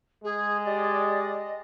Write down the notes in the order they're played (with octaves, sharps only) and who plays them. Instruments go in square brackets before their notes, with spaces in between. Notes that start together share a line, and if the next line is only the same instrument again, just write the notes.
[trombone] G#3 [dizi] G#4
[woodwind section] G4 D5 [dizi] D#5